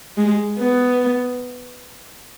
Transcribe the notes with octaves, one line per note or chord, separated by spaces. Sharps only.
G#3
B3